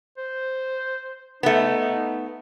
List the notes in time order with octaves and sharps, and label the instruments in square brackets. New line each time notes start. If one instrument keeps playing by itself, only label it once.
[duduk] C5
[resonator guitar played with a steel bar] A3 B3 [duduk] D#4